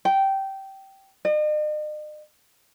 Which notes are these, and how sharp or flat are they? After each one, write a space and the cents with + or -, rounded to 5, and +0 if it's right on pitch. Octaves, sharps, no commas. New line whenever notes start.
G5 -15
D#5 -45